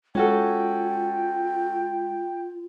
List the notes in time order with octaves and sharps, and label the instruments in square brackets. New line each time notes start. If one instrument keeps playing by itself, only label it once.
[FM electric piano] G#3 [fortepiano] C#4 F#4 A4 [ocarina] F4 [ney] G5